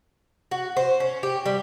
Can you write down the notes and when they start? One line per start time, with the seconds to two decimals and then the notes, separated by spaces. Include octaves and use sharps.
0.51 F#4
0.77 C5
1.00 C#4
1.23 G4
1.45 G3